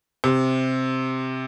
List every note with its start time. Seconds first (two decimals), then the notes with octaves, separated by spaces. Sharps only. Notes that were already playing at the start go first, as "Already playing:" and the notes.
0.24 C3